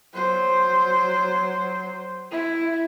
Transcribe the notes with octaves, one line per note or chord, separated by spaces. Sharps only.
F#3 C5
E4